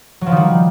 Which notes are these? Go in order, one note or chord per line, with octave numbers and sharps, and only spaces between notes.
F#3
F3
D#3
G3